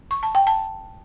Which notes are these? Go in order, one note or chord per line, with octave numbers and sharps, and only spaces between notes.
C#6
A5
G5
A5